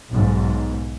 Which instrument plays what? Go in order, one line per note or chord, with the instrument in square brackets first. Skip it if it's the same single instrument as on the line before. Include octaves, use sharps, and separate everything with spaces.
[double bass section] B1 G#2